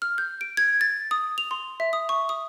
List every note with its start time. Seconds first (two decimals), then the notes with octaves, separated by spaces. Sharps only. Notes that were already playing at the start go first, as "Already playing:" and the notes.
0.02 F6
0.18 G6
0.41 D7
0.57 G#6
0.81 A6
1.11 D#6
1.38 F7
1.51 C6
1.80 E5
1.93 D#6
2.09 C#6
2.29 D#6